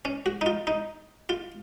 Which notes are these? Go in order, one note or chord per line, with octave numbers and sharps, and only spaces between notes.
C#4
F#4
D#4
F4
D#4
F4